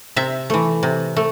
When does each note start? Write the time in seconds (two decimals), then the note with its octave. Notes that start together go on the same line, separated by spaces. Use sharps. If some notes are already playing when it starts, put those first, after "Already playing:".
0.16 C3 E5
0.50 E3 A3
0.83 C3
1.16 A3